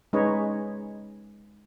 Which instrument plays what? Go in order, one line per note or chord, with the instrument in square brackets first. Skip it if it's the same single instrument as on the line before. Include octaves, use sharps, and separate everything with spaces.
[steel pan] G#3 C#4 D#4 B4 C#5 D#5